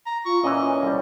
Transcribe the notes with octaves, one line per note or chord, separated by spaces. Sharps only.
A#5
F4 C#6
A#2 E3 C#4 D#5
C2 G3